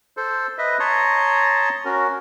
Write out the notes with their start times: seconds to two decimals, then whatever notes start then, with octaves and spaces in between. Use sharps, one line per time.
0.17 A4 C5
0.58 B4 D#5 E5
0.80 C#5 A5 A#5 C6 C#6 D#6
1.85 C#4 F#4 A#4